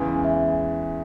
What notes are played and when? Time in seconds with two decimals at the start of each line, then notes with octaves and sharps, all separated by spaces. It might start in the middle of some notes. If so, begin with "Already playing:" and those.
Already playing: E2 C#3 E3 G#3
0.24 E5